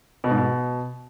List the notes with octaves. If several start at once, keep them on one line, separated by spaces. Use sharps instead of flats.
B2
G#2
B2